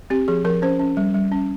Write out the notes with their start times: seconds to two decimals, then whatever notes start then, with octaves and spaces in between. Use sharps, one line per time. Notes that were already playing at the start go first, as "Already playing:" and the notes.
0.10 C4 G4
0.28 F3 G#4
0.45 F3 A#4
0.62 C#4 C5
0.79 C#4
0.97 G3
1.15 G3
1.32 C#4